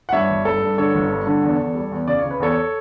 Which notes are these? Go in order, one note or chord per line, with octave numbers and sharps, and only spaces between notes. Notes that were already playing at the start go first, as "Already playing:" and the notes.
F#5
G2 C#5 E5
G1
G2 A4
G2
D3 A4 C#5
G1
G2
D3
E2
E2
G3
E2
C#3 D5
C#5
C#3
B4
E2 A4 C#5